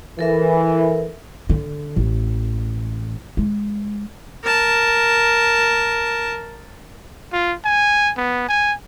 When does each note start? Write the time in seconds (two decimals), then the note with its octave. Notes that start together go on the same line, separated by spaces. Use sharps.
0.19 E3 A4 A#4 E5
1.49 D3
1.96 A1
3.37 G#3
4.43 A#4 A5
7.33 F4
7.65 G#5
8.17 B3
8.48 G#5